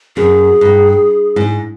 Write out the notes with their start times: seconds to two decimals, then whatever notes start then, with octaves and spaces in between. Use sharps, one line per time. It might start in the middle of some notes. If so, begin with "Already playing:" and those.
0.16 F#2 G#4
0.61 G2
1.36 G#2